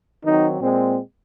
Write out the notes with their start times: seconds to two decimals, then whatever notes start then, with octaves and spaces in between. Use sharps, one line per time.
0.23 D#3 F#3 C4 D#4
0.60 A#2 G#3 C4